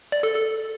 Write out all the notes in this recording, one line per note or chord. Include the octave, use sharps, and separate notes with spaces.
D5
A4
A4